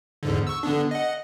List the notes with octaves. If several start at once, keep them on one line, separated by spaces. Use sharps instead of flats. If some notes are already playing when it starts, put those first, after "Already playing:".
E2 G#2 D3
C#6 E6
D3 B3 D4
D#5 F#5